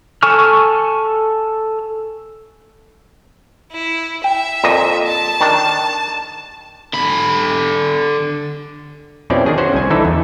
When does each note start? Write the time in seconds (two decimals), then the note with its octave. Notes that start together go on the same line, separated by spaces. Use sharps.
0.23 A4 G#5 C#6 F6
3.72 E4
4.24 E5 G5
4.64 F2 A#2 D#5
5.06 A5
5.41 D#3 D4
6.93 D3 B5
9.30 F2 B2 C4 C#4 E4 D5
9.46 D#3 D4 G#4
9.58 C#4 F#4 C5 F#5
9.74 C2 G#5
9.90 D3 E3 D#4 E4 A4
10.05 E2